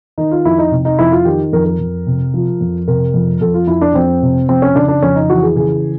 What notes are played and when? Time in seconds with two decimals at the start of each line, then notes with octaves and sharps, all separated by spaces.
0.18 D#3 D#4
0.31 F4
0.45 F2 E4
0.58 D#4
0.72 C3
0.85 D#4
0.99 F2 E4
1.12 F4
1.25 D#3 G4
1.53 F2 A#4
1.66 A#4
1.79 F2
2.07 C3
2.34 F3
2.61 F2
2.87 C3 A#4
3.14 F2
3.41 F2 A4
3.54 F4
3.67 F2 E4
3.81 D4
3.94 F2 C4
4.22 C3
4.49 F2 C4
4.62 C#4
4.75 C#3 D4
4.88 D4
5.02 F2 C#4
5.16 D#4
5.30 E3 F#4
5.43 G#4
5.56 C#3 G#4